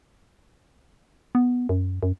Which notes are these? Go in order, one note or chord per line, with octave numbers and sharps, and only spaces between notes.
B3
F#2
F#2